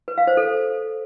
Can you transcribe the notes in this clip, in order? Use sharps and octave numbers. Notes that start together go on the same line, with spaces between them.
B4
F5
C5
A4